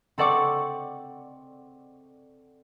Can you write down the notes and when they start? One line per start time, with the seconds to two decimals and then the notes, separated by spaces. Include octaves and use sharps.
0.18 C4 A4 D5 F#5 C#6 D6